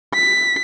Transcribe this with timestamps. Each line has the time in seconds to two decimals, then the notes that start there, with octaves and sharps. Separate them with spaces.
0.14 B6